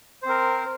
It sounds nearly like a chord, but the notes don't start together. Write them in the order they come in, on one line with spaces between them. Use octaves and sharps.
C5 C4 A#4